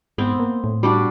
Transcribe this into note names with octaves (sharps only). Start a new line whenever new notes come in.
G#2 B3 C4
A#3
A2
G3 D4 F#4